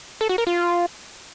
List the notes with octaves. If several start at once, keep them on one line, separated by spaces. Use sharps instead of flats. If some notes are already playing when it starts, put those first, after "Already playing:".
A4
F#4
A#4
F4